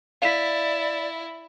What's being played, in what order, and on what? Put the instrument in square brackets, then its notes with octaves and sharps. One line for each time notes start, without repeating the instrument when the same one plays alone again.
[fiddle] E4 [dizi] D5 [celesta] F5 B6